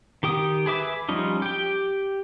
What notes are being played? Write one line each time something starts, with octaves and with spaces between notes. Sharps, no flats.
D#3 G4 G5 D#6
G#4 B4 E5 D6
F3 G3 C#4 D#4
G4 G5